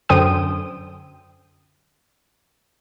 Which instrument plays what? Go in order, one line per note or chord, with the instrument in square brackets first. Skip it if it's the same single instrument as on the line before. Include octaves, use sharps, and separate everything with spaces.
[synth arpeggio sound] F#2 D3 C5 G5 D#6 D#7